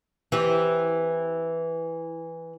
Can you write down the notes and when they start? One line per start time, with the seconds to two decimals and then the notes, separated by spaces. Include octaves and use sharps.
0.32 E3 C4 G4